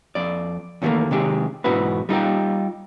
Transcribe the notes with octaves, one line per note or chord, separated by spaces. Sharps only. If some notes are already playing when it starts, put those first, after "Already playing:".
F2 D5
E2 D#3 E3 G3 A3 A#3
C3 D#3 G#3 G4
E2 G#2 B2 E4 F#4 B4
G3 D#4 F4 G4